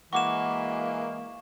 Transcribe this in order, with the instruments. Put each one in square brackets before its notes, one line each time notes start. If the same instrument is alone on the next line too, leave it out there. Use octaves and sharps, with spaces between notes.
[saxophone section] E3 G#3 A#3 [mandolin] F#4 [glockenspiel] C#6 D6 E7